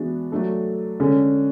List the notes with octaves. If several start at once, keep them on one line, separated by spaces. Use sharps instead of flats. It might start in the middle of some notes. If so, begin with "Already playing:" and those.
Already playing: E3 G#3 B3 D4 F#4
F#3 A3 D4 A4
D3 G#3 C#4